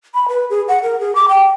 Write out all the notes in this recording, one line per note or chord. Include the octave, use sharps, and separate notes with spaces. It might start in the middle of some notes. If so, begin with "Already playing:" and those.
B5
B4
G#4
F#5
A#4
G#4
D6
G5